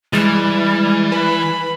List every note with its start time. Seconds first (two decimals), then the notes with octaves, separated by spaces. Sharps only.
0.13 E3 G3 G#3
1.12 B4 B5